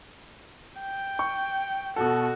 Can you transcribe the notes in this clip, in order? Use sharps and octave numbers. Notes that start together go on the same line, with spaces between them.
G5
C#6
B2 F#4 A4